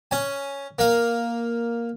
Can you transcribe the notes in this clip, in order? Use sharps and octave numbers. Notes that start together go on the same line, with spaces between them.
C#4 G#5
A#3 F5